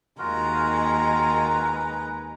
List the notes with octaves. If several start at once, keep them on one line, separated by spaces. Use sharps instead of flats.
D#2 G#3 F4 F#4 A#4 A#5
B4